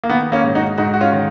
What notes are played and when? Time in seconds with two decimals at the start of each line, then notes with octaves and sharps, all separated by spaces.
0.04 A#3
0.09 D#3 B3
0.32 A#3 C#4
0.44 G#2
0.55 D#4 F#4
0.78 G#2 D#4 F#4
0.94 F#4
1.01 C#4 F4
1.12 D#3